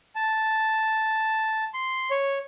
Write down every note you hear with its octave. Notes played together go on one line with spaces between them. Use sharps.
A5
C6
C#5